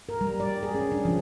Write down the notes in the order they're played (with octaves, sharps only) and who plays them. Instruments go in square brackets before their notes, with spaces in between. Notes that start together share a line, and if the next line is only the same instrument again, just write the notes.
[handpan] A#4
G3
D5
G#4
C#4
D4
F3